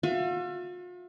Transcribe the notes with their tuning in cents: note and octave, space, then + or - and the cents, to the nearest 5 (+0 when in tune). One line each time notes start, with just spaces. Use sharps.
F4 +45 E5 +40